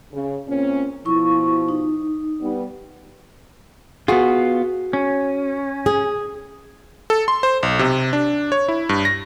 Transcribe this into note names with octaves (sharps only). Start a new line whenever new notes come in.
C#3
A#2 C4 C#4
B2 F3 E4 C#6
D#4
G3 B3
B3 F4 F#4 G#4
C#4
G#4
A4
C6
C5
B1
C3
D4
C#5
E4
G2
A#6